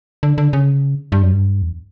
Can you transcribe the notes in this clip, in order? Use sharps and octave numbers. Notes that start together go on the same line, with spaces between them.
D3
D3
C#3
G2
F#2
G2
E2